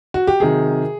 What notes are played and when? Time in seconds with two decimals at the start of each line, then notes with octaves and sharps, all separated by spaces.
0.14 F#4
0.27 G4
0.40 C3 D#3 F#3 G#4